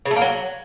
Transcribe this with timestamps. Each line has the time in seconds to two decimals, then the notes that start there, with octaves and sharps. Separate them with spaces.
0.05 C#3
0.11 A3
0.16 A#3
0.21 F#3